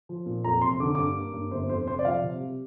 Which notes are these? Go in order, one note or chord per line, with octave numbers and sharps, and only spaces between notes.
F3
A#2
F2 A#5
F1 C6
D3 D6
G2 D6
A#3
G2
G1 C5
F2 C5
F1 C5
D5
F3 F5
C3
G3